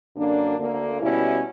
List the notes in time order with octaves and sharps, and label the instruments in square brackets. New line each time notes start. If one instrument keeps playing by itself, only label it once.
[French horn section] F#2 D3 A#3 D4
D2 D3 A#3
B2 G3 C#4 E4